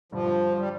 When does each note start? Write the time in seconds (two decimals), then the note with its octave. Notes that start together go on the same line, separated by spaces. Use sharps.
0.12 G2 D3 F3 G3 D4
0.59 G3